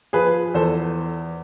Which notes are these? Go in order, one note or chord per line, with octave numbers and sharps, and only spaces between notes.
F3 G#4 B4
E2 A4 C5